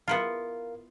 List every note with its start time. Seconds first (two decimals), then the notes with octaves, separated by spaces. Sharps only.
0.08 B3 E4 F4 A#4 F5